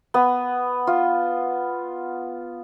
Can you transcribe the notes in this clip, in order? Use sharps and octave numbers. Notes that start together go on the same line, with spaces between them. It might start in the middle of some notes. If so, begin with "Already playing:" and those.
B3
F4